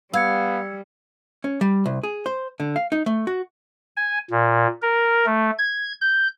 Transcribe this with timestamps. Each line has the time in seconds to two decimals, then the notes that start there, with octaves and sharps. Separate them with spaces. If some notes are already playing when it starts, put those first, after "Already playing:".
0.13 G3 B3 F5 E6 G#6 C#7
1.44 C#4
1.61 G3
1.86 C2
2.03 G#4
2.26 C5
2.60 D3
2.76 F5
2.92 D#4
3.06 A3
3.27 F#4
3.96 G#5
4.31 A#2
4.82 A#4
5.26 A3
5.58 G#6
6.01 G6